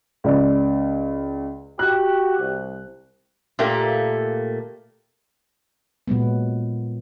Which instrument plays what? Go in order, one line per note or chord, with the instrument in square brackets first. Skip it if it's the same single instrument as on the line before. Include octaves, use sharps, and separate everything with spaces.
[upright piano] C#2 D5
[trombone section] F#4 G4 [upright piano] F#6
[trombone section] C2
[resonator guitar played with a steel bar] A#2 A3 A#3 G4
[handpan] A#2 F#3 G#3 B3